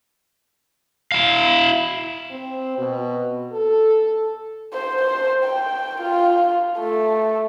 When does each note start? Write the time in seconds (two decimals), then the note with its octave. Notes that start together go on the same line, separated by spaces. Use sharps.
1.12 E4 F5
2.31 C4
2.78 B2
3.53 A4
4.73 C5
5.02 C5
5.44 G5
6.02 F4
6.79 A3